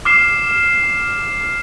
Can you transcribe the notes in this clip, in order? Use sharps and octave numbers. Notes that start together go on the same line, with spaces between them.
D6 F6 C7 E7